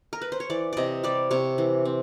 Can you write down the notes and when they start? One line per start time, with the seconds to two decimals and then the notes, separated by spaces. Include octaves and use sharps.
0.13 A#4
0.22 B4
0.32 C5
0.40 C#5
0.50 E3 D5
0.73 C3 D5 D#5
1.04 G3 D5
1.31 C3 C#5
1.58 E3
1.85 C4